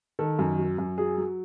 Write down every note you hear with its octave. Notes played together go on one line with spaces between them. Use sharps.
D#3 A4
F#2
F#3
F#2
F#3 G#4
F#3